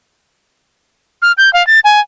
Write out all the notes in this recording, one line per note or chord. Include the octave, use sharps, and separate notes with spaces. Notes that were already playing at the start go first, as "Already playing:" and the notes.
F6
G6
F5
A6
G#5